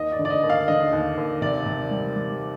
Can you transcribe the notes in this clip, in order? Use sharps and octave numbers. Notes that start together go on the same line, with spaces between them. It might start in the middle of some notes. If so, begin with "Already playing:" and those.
Already playing: D#2 D#5
D5
D3
D5
D#5
D#2
F5
D3 D#5
D#2
D#2
C3 D5
C3
G3
G3